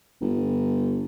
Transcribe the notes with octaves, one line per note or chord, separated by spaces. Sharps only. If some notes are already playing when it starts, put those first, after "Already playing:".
G1